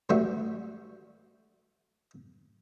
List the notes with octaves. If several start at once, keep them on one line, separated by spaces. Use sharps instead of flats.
A2 E3 G3 D4 F#4 E5